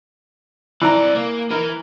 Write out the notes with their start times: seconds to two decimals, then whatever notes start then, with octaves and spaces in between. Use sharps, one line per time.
0.81 C2 E3 D5 A#5
1.15 A#3
1.50 E3 A#4